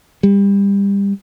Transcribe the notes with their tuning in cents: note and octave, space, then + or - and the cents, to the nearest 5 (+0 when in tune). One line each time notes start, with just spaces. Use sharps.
G3 +25